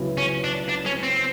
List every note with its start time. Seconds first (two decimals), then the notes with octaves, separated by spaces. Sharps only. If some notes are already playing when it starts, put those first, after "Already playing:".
Already playing: C#2 C#3 F#3 B3 E4
0.18 C#4
0.44 D4
0.69 D4
0.86 C#4
1.03 C4